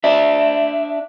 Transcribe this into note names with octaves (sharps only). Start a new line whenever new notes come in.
D4 E5